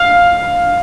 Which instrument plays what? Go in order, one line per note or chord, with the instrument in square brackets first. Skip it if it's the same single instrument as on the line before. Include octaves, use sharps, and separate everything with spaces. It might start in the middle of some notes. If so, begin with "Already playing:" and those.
Already playing: [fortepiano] F5